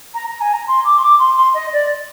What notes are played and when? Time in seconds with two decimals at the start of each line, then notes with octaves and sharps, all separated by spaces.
0.14 A#5
0.28 A#5
0.40 G#5
0.53 A#5
0.67 C6
0.84 D6
0.97 C6
1.02 D6
1.19 C6
1.36 C6
1.54 D#5
1.72 D5